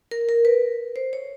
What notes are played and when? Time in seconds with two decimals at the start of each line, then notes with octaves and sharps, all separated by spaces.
0.11 A#4
0.29 A#4
0.45 B4
0.96 C5
1.13 C#5